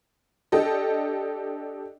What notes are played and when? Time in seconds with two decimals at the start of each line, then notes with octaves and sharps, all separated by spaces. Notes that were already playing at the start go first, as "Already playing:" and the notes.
0.52 D4 G4 A4 D#5